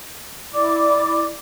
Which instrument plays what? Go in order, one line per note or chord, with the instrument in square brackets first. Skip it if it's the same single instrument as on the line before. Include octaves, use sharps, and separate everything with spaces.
[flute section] E4 D5 D6